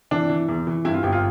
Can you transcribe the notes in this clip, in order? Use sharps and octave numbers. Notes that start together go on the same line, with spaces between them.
E3 D4
E3
E2
E3
G2 E4
F4
G1 G4
F4